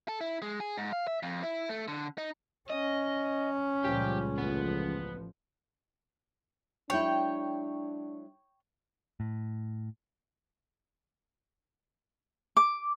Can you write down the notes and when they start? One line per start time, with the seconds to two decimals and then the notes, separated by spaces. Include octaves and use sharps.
0.08 A4
0.21 E4
0.42 G#3
0.60 G#4
0.78 G#2
0.93 F5
1.07 E5
1.23 F2
1.43 E4
1.69 A3
1.88 D3
2.18 D#4
2.70 C#4 D#5
3.85 C#2 A#2 F3 G3 G4
4.38 A1 F3 B3
6.90 F#3 G#3 D4 E4 C#5 G5
9.20 A2
12.57 D6